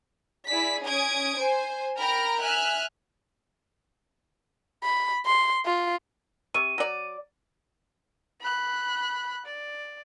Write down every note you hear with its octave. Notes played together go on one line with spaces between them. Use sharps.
E4 G#4 D5 B6
C#4 D#6 G#6 D7
C5 G#5
A#4 G5 A#5 B5 F6
E5 G#5 F6 F#6
B5
C6
F4
C3 C#6 D#7
F#3 D5
B5 F#6
D5